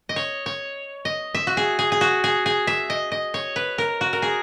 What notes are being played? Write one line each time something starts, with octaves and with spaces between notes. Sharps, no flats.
D#5
C#5
C#5
D#5
E5
F#4
G#4
G#4
G#4
F#4
G#4
G#4
E5
D#5
D#5
C#5
B4
A#4
F#4
A#4
G#4